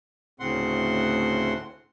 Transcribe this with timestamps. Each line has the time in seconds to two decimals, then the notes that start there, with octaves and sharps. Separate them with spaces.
0.40 D2 A2 C#3 C4 F#5 C6